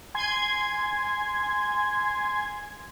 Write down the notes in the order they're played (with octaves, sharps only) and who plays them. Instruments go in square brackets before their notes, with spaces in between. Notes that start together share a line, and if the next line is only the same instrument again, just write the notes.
[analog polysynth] G#5 C6 G#6